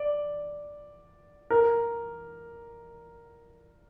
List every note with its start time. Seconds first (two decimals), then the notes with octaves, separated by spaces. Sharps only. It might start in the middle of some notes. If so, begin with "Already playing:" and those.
Already playing: D5
1.50 A#4